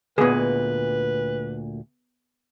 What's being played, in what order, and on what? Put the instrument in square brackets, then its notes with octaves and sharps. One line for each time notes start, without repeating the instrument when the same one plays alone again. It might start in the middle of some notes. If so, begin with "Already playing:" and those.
[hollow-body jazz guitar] D2 A#2 [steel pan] B3 G#4 [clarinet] B4